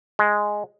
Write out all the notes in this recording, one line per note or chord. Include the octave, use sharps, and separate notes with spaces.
G#3